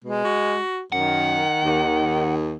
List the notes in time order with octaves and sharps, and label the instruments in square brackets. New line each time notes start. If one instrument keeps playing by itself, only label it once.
[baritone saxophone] B2 [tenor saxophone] G#3
[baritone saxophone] F#4
[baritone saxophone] F#2 [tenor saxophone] D#3 [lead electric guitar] F#5
[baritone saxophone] D#2